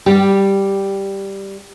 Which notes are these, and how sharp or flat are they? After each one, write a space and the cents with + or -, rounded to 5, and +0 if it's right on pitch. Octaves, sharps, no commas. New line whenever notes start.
G3 +0 G4 +0